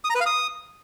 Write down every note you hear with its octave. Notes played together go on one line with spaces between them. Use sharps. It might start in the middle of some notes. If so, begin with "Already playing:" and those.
D#6
A#5
B4
F5
D#6